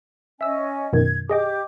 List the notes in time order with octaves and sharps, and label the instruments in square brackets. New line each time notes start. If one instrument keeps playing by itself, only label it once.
[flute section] C#4 D#5 G#5 [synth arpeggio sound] E5 E6
[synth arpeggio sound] F#2 B2 D#3 [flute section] G#6
[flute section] G4 D6 [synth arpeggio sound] G#4 D#5 G5